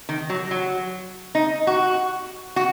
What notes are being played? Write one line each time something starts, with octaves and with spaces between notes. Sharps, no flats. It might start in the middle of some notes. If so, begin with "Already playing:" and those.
D#3
F#3
F#3
D#4
F#4
F#4